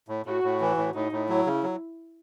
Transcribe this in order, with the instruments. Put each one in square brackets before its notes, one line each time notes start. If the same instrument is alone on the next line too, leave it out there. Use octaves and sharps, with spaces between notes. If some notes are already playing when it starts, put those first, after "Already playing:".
[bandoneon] A2
[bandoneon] A2 [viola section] F#4
[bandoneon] A2
E3
A2
[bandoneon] A2 [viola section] D#4
[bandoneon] A2
[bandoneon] F#3 [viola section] E4
[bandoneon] C#3
F#3